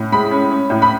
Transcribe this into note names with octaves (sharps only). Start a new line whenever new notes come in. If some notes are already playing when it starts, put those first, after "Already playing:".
Already playing: A2
G#3 B5
C#4
C#4
A2
B5